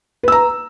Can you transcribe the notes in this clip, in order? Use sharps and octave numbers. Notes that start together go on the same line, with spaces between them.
B4 A#5 E6